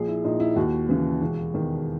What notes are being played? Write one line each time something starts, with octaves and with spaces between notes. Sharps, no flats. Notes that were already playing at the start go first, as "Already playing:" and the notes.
Already playing: A#1 G#4
E4
A#2 D#4
E4
D#2 F#4
C#3 E3
E1
E2 D#3